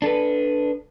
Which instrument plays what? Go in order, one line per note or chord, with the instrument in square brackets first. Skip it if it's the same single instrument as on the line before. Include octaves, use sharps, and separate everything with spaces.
[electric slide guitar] D4 A4 B4